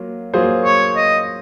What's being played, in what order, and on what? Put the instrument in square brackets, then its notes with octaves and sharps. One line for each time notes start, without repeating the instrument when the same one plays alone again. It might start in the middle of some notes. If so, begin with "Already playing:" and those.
Already playing: [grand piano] F#3 A#3 F4
F#3 A#3 F4 G#4 C5
[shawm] C#5
D#5